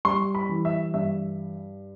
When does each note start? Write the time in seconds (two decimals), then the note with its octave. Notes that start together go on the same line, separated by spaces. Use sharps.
0.05 G3 C6
0.35 B5
0.49 E3
0.65 E5
0.94 G2 E5